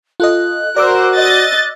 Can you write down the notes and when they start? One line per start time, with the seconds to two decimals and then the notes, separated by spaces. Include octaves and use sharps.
0.20 F4 A4 D#5 F#6
0.76 F#4 A#4 C5 D5 D6 E6
1.14 D#5 A6